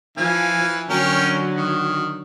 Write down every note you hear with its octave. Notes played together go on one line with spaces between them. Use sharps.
E3 F3 F5 G#5
D3 F#3 C#4 F#4 A#4 G5
D#3